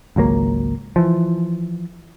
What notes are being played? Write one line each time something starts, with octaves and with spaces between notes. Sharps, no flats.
G#1 C#2 F#3 A#3
E3 F3